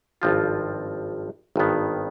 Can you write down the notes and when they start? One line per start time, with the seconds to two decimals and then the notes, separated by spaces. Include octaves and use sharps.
0.22 G#1 G2 F3 C4 F4
1.56 G#1 G2 D#3 B3